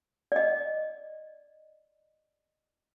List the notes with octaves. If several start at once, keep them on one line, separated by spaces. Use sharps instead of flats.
D5 D#5